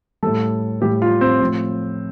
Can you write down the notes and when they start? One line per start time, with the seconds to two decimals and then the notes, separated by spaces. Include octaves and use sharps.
0.23 A2 G3 A4
0.81 A2 G3 G4
1.02 F4
1.21 C4
1.41 A2 F3